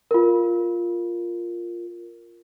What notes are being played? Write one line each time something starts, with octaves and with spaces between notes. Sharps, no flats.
F4 A#4